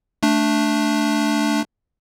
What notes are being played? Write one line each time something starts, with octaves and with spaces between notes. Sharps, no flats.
A3 D4